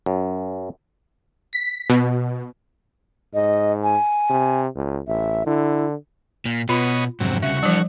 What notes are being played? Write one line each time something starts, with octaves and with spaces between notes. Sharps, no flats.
F#2
B6
B2
G#2 D#5
G#5
C3
C#2
A1 E5
D3 E4
A#2
B2 B3 F4 C#5 D#5 B5
F2 G#2 C3 F#3
C2 C#3 F#4 E5 C#6
E3 F3 G3 D4